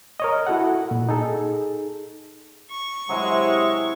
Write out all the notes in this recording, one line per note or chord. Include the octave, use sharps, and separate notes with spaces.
A#4 C#5 D#5
E4 F#4 A4 F#5
A#2
D#4 G#4 A4
C#6
C3 F#3 G#3 E4 F#4